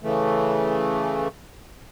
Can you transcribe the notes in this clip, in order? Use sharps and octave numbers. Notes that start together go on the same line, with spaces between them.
C#3 E3 A3